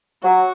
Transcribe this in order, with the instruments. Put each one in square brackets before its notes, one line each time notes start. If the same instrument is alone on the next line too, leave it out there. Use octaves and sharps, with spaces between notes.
[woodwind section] F#3 [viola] F#4